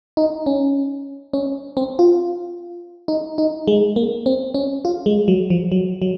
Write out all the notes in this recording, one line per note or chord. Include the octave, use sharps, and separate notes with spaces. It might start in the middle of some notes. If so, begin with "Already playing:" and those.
D#4
C#4
C#4
C4
F4
D#4
D#4
G#3
A#3
C4
C#4
F4
G#3
F#3
F3
F#3
F#3